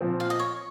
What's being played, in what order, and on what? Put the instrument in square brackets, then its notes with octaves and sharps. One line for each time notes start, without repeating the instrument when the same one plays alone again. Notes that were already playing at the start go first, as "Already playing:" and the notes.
[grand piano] A#2 F3 C4
[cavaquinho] F5
D#5
C#5